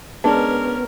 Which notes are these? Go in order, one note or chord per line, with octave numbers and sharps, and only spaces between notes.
G#3 B3 C#4 D4 A#4 A5